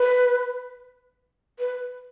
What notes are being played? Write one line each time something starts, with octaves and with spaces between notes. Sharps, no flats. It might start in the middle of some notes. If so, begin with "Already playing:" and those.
Already playing: B4
B4